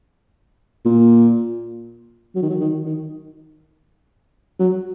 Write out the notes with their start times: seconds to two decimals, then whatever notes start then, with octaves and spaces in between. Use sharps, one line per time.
0.86 A#2
2.35 F#3
2.43 D#3
2.50 F#3
2.60 D#3
2.86 D#3
4.59 F#3